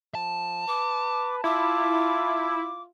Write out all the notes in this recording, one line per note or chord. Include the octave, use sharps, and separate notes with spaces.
F3 A5
B4 D6
E4 F4 D6